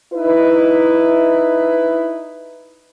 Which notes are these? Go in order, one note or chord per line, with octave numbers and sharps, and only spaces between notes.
D#4 E4 B4